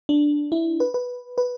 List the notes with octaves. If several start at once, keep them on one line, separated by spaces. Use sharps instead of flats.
D4
E4
B4
B4
B4